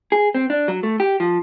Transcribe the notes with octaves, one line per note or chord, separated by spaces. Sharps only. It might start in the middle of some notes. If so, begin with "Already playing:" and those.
G#4
C4
D4
F#3
A3
G4
F3